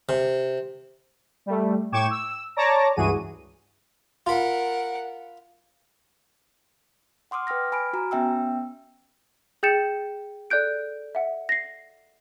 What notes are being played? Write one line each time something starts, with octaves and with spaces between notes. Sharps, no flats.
C3
G3 A3
A2 G5 C#6 D6 G#6 E7
E6
C#5 D5 A5 A#5 D6 A#6
C#2 G2 E3 F#4 G#4 D#7
F4 A#4 F#5 B5
F#5 C6 D6 D#6 F6
B4 G5 D6 F6 A#6
G#5 B5 F6 D7
F#4 G#5 A#5
B3 C#4 E5 G5 E6
G#4 G5 G6 A6 C#7 E7
A4 D5 F#6 G6 D7
E5 F#5
A#6 C7